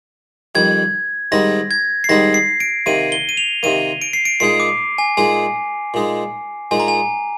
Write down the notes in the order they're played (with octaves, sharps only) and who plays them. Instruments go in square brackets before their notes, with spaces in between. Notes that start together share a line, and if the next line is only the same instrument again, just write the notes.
[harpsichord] F2 D#3 G3 [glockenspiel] G#6
[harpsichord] G#2 D#3 G3 C4 D#4 [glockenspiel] A#6
[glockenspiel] G#6
C7
[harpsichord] G#2 D#3 G3 C4 D#4 [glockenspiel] A#6
[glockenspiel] C7
D7
[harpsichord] C3 D#3 A#3 [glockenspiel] D#7
[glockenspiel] G7
D#7
F7
[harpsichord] C3 D#3 A#3 [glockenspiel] D#7
[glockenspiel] D7
C7
D7
[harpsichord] A#2 G#3 D#4 G#4 [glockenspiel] C7
[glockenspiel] D6
G#5
[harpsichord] A#2 G#3 D#4 G#4 [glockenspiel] G#5
[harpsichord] A#2 G#3 D#4
[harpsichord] A#2 G#3 D#4 [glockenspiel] G#5
[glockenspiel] A#5
G#5